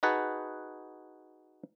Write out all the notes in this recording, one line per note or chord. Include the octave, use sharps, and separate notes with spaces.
D#4 F#4 G#4 B4 F#5 A5